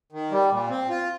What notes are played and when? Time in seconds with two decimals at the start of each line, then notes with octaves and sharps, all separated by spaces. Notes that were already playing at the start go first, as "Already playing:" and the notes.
0.12 D#3
0.31 G3
0.51 A#2
0.70 C4
0.89 F4